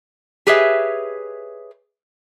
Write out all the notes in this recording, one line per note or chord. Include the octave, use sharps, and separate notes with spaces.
G4 G#4 B4 C#5 D#5 E5